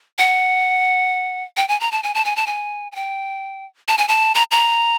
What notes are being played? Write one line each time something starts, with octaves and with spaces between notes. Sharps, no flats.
F#5
G5
G#5
A#5
A5
G#5
A5
G#5
A5
G#5
G#5
G5
A5
G#5
A5
A#5
A#5